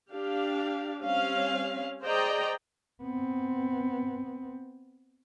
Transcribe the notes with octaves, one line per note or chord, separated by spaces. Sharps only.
D4 G4 F5
G3 C4 C#4 F5
G#4 C5 D5 D#5 G5 A#5
B3 C4